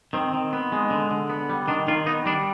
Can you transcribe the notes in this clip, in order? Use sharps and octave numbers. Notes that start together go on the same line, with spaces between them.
D#3 C4
D#3
B3
G#3
D3
D3
B3
G3
D#3 D4
D#3 F4
B3 D#4
G3 D4